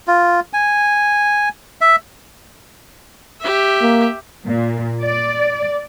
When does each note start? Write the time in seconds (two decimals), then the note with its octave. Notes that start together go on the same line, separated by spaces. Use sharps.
0.08 F4
0.53 G#5
1.81 E5
3.41 G4 E5
3.82 A#3
4.46 A#2
5.04 D5